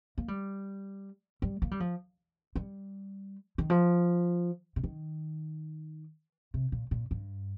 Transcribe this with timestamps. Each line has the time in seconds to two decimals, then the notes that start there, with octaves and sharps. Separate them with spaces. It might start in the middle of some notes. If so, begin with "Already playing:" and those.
0.18 A#3
0.28 G3
1.42 G3
1.62 A#3
1.71 G3
1.80 F3
2.56 G3
3.58 D#3
3.70 F3
4.76 C3
4.84 D#3
6.54 C3
6.72 A#2
6.91 A#2
7.11 G2